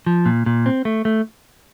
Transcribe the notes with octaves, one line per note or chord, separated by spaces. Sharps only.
F3
A#2
A#2
C4
A3
A3